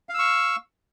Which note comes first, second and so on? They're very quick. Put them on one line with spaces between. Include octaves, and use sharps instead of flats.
F5 E6 C#6